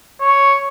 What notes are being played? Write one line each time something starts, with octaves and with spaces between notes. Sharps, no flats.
C#5